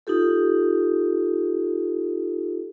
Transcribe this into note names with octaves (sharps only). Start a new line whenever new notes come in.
D#4 F4 G4 A4